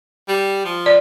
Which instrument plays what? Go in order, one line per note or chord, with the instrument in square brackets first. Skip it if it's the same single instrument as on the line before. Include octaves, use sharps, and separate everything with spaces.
[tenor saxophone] G3
F3
[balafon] D5